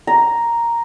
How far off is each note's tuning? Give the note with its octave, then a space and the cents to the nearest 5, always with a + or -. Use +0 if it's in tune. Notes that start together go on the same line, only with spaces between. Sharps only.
A#5 +0